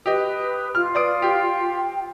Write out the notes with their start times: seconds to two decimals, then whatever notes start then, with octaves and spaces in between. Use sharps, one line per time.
0.06 G4 B4 D#5 D#6
0.75 F4 F6
0.95 B4 D5 D#6 D7
1.22 G4 G5